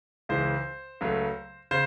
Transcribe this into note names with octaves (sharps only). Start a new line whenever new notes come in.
C#2 C#3 E3 G#3 C5
C#2 C#3 F#3 A3
C#3 C5